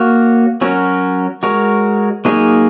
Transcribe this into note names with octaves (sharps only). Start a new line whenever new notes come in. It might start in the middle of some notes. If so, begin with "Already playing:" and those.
Already playing: A#3 F#4 C#5
F#3 C#4 F#4 A#4
G#3 F#4 A#4 C#5
F#3 A#3 D#4 G#4 C#5